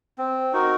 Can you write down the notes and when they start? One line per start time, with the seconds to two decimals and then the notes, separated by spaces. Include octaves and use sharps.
0.18 C4
0.53 D#4 F#4 A#4